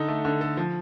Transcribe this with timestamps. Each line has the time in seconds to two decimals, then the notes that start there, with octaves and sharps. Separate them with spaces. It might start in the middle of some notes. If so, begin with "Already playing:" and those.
Already playing: D3 D#4 A4
0.08 A3
0.25 D3
0.41 A4
0.57 F3